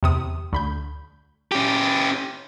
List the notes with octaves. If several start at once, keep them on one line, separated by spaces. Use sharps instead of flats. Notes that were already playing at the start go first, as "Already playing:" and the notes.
E2 C3 D#6
D2 B5 G6
C#4 G4